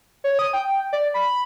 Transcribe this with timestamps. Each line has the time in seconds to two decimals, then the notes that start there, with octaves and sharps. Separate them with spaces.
0.24 C#5
0.39 D#6
0.53 G5
0.93 D5
1.14 B5